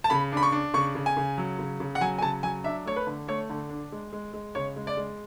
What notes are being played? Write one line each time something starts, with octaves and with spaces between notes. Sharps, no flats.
A5
C#3 B5
D4 B5
C#6
D4
C#3 C#6
C#3
G#5
C#3
F#3
C#3
C#3
F#5
F#3 G#5
G#5
C#3 A5
F#3 G#5
D4 E5
A3 C#5
B4
D3
A3 C#5
D3
D4
G#3
G#3
G#3
C#3 C#5
G#3
D5
G#3